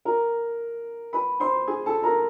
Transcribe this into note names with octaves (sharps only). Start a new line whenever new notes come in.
A#4 A#5
B4 B5
C5 C6
G#4 G#5
A4 A5
A#4 A#5